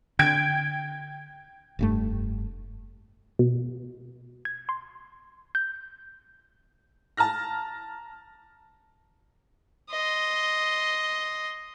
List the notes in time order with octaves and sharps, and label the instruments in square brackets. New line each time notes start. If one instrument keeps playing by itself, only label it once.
[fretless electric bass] D3 [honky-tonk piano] G5 G#6 D7
[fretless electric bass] F1 G2 A3
[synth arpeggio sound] B2
G#6
C6
G6
[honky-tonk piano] A5 A#5 F6 A#6
[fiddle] D#5 C6